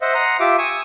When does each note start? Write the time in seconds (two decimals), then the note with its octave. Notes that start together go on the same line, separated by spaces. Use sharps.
0.02 C5 D#5 E5 F#5
0.14 F#5 A#5 C6 D#6
0.40 F4 G4 E5 D6
0.58 G#5 C#6 D#6 E6